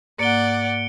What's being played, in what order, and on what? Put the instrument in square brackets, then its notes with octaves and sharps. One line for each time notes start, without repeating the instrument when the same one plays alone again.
[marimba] G#2 A#3 [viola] D5 F#5 [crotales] C#7 D7 G7